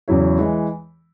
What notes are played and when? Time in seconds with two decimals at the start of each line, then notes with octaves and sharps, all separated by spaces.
0.08 E2 C#3 F#3 E4 C#5
0.39 E3 G#3